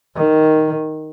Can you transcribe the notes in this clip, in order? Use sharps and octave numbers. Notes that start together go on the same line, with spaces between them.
D#3